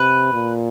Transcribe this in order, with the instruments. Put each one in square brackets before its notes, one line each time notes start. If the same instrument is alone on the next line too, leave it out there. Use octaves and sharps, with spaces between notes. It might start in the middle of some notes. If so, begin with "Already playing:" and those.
Already playing: [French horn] C3 [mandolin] B4
[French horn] A#2